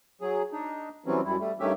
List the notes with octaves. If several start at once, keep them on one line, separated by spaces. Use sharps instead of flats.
F#3 G#4
D4 D#4
E3 F#3 G3 C4 C#4
F#2 G3 E4
G3 A3
G2 D#3 A3 C#4 G4 E5